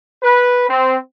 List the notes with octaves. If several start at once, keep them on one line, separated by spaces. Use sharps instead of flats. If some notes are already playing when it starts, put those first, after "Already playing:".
B4
C4